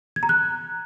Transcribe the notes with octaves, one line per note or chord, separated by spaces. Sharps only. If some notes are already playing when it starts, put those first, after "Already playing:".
G#6
A#5
F#6